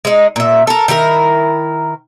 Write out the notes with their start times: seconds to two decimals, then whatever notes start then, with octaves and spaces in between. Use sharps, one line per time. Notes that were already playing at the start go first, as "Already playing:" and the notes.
0.05 G#3 D#4
0.36 A#2 E5
0.67 A4 A#4
0.88 D#3 E4 F#4 A#4